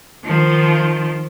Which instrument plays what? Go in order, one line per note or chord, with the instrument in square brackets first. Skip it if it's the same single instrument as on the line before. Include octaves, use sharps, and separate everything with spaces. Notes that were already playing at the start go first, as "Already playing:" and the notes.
[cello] D#3 F3